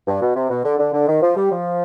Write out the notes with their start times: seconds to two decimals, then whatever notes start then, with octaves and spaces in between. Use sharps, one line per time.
0.07 G2
0.22 B2
0.35 C3
0.49 B2
0.64 D3
0.79 D3
0.93 D3
1.08 D#3
1.22 F3
1.36 G3
1.51 F3